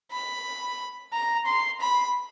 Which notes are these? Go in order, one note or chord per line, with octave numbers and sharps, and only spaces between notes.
B5
A#5
C6
B5